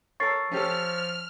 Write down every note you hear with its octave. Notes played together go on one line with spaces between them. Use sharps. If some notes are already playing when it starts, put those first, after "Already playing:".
A4 A#4 C#5 C#6 A6 C7
F3 C#4 G4 A4 F6